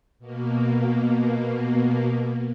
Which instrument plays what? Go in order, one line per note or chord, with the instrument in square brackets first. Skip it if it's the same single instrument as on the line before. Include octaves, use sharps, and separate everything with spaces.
[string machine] B2 A#3